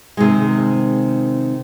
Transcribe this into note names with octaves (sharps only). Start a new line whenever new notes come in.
C3 D#3 G#3